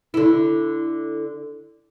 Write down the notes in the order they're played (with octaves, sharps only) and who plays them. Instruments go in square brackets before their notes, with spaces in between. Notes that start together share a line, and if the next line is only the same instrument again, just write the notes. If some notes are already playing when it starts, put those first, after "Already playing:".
[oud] D3 E4